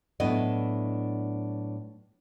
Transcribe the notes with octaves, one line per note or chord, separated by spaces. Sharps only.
A2 F#3 B3 D4 E4 D#5